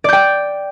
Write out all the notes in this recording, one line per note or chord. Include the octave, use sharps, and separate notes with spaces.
D5 G5 G6